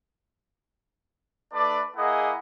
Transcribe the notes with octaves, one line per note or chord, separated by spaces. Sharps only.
A3 D4 B4 D5
A#3 E4 G#4 D#5 F#5